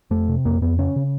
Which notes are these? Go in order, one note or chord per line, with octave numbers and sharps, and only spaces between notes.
F2 A3
C3
F2 A#3
F2 B3
C#3 C#4
C#3